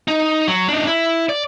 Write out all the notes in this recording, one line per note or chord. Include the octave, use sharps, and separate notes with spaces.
D#4
F#3
D4 D#4
E4
D5